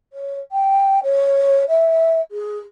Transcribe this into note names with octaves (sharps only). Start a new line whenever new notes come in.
C#5
G5
C#5
E5
G#4